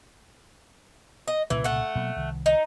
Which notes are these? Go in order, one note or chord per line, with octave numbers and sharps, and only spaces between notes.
D#5
C2 A#2 C#3 E3
A3 F#5
B2 F#3 A#3
C2 D#3
D#4